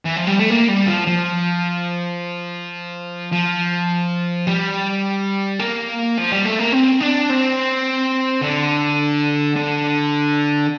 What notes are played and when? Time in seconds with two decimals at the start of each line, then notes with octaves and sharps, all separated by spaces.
0.05 E3
0.16 F3
0.27 G3
0.39 A3
0.50 A#3
0.68 G3
0.87 F3
1.07 F3
3.32 F3
4.47 G3
5.59 A#3
6.18 F3
6.32 G3
6.45 A3
6.59 A#3
6.72 C4
7.00 D4
7.30 C4
8.42 D3
9.56 D3